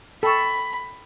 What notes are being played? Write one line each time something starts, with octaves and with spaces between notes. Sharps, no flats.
A4 G5 B5 C#6